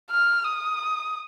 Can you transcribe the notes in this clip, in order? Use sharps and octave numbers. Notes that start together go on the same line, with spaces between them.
F6
D#6